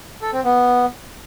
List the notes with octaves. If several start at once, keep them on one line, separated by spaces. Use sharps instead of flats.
A4
C4
B3